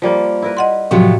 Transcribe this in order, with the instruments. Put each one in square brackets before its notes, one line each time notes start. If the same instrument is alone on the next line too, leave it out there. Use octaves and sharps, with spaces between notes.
[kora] F3 G3 A#3
E4 A#4 B4
[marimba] D#5 F#5 C6
[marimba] A2 [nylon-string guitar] C3 F3 F#3